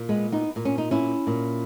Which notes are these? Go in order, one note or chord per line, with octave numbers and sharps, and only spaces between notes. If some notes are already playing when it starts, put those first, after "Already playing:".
Already playing: A#2
G#3 B3
B3 D#4
A#2
C#4
D#4
C#4 E4
A#2